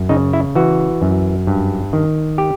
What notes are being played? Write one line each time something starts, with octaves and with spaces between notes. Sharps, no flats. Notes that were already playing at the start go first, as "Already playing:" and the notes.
Already playing: F#2
C#3 D#4
E4
E3 F#4
F#2
G2
D#3
G4